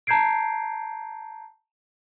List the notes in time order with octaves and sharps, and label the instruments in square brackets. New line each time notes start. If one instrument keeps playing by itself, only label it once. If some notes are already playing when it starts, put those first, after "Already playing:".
[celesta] A5 A#5 G6 G#6 C7 D7